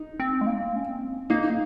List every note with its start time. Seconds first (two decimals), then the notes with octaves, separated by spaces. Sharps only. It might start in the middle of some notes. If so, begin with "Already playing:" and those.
Already playing: D#4
0.20 C4
0.41 G#3
0.47 A#3
0.76 C#4
0.88 C4
1.30 A#3 D#4